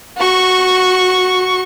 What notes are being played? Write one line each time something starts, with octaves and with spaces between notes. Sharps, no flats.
F#4 C#6